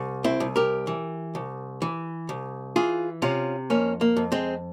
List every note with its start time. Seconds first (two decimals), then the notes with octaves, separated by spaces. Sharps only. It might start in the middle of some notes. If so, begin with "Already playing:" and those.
Already playing: C2
0.24 C4 E4
0.40 C2
0.56 G4 A#4
0.87 E3
1.35 C2
1.82 E3
2.29 C2
2.76 E3 F4 G#4
3.22 C3 C#4 F4
3.70 F2 A#3 C#4
4.01 A#3
4.16 F2
4.32 G#3 C4